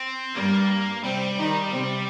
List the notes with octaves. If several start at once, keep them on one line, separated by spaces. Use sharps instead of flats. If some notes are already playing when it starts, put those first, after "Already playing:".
Already playing: C4
G2 G3 A#3
C3 G3 C4
D#3 D#4
C3 C4